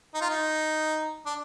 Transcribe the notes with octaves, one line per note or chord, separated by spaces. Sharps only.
D#4
F4
D#4
D4